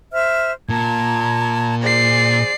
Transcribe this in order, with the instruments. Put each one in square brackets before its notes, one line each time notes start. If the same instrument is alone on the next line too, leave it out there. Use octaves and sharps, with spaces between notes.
[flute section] C5 E5 F6
[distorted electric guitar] A#2 [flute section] A5 A#5 G#6
[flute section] G#4 C5 [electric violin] D5 C7